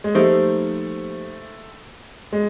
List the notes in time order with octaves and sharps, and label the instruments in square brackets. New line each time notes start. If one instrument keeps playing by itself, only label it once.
[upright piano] G#3
[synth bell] F3 A#3 D#4 G4 C5 [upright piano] A3
[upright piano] G#3